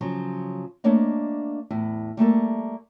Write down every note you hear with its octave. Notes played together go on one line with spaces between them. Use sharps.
C#3 F3 F#3
A3 A#3 D4 C#5 D#5
E2 A2 E4
G3 A3 A#3 A4